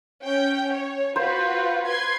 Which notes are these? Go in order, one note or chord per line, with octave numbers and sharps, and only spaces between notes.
C#4 G5
C#5
F4 F#4 B4 C5
B4 C6 G#6